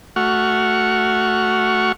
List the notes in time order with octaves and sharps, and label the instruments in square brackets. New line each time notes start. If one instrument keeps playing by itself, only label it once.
[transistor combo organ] A3 F#4 F#5 C#6 F6